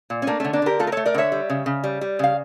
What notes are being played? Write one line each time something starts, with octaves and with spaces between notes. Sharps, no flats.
A#2
C#4
A3 A#3 D4
D3 A3 C#4
A#3 D4
D3 G4 A#4
A3 F4 A4
A#4
A3 A4 C#5
A#4 D5
D3 C#5 E5
G3
C#3
C#3
G3
G3
C#3 F5